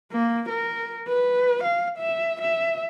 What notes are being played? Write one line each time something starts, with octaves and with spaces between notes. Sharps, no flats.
A#3
A#4
B4
F5
E5
E5